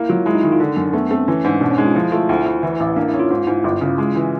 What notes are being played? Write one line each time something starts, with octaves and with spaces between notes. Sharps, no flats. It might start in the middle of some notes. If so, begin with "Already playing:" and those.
Already playing: A#3 E4
F#3 F4
G#3 E4
D#4
D#3 E4
F4
D3 D4
F#2
A3 B3
A3 C4
E3 C#4
G#2 D4
B2 D4
C#4
G#3 D#4
F4
F3 E4
A3 F4
D2 E4
D2
E3 E4
A1
A#3 D4
E4
C#4
F4
G#2 F4
G#2 E4
G1
C#3
G#3
E3